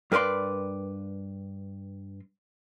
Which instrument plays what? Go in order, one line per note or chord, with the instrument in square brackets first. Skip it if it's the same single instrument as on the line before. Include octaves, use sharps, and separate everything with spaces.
[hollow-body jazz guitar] G2 A#4 B4 D5 C6